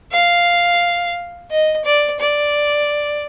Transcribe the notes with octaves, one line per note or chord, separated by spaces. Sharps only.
F5
D#5
D5
D5